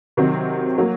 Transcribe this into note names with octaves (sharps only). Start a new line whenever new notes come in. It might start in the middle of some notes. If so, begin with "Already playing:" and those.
C3 D#3 F#3 C4
F#3 A#3